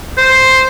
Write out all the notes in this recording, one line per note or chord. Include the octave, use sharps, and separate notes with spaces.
C5